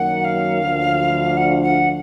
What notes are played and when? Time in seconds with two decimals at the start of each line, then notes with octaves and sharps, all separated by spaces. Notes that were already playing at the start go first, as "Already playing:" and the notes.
Already playing: F#2 D#3 F#3 A#3 F#5
0.24 F5
0.62 D2 D3 F3
1.37 F#5
1.62 F#5